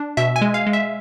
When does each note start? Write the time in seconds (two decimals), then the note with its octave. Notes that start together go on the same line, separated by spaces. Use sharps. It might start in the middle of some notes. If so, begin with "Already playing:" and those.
Already playing: D4
0.17 B2 E5
0.36 G#5
0.41 G#3
0.54 F5
0.67 G#3
0.73 E5